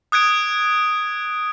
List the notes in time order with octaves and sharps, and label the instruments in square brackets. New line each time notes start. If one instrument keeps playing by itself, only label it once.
[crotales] D#6 F#6 G#6 D7